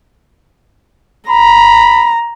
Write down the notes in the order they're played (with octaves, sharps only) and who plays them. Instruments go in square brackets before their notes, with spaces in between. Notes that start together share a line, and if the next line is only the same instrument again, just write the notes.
[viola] A#5 [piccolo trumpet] B5